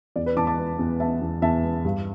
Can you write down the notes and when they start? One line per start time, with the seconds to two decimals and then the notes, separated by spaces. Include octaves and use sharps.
0.16 E2 D5
0.26 B4
0.37 E2 A5 D6
0.47 A5 D6
0.58 B3
0.79 E2
1.00 B3 E5 A5
1.22 E2
1.42 E2 E5 A5
1.64 B3
1.85 G2